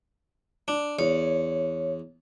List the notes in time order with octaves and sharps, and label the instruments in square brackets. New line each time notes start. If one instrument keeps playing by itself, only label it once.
[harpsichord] D4
[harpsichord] E2 [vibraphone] C#5